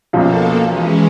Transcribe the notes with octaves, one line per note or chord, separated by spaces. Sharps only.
B1 F#2 B2 F3 A#3 A4 F5
E3 G#3 C#4